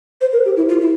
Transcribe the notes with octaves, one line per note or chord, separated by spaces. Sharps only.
C5
A#4
G4
E4
F4
E4